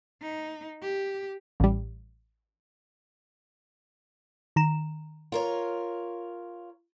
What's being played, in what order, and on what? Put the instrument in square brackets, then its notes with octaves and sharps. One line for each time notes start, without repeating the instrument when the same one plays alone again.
[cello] D#4
G4
[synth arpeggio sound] A1 G3
D#3 A#5 E7
[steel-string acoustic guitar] F4 A#4 C#5